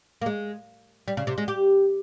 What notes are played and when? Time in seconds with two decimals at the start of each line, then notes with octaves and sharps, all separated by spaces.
0.22 A#3
0.26 G#3
1.08 G3
1.17 C#3
1.27 C3
1.38 G#3
1.48 G4